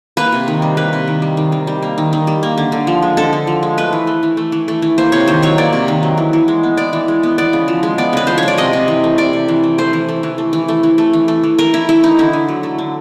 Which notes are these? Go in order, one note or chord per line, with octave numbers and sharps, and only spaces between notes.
A#3 B4
C3
D#3
G3
A#3 B4
C3
D#3
G3
D#3
D#3
G3
A#3
D#3
D#3
G3
A#3
D3
D3
F3
G#3
D3 A4
D3
F3
G#3
A3 B4
E3
A3
E3
A3
E3
A3
E3
A#3 C5
C3 C#5
D#3 C5
F#3 C#5
A#3 D5
C3
D#3
F#3
E3
E3
G#3
B3
E3 D5
E3
G#3
B3
B3 D5
C#3
F3
G#3
B3 D5
C#3 B4
F3 C5
C#5
G#3 D5
C3 D#5
C3
E3
A3
C3 D5
C3
E3
A3
A3 C5
E3
A3
E3
A3
E3
A3
E3
A3
E3
A3
E3
A3 A#4
E3 E4
A3 E4
E3 D#4
D3 E4
D3
F#3
A3
D3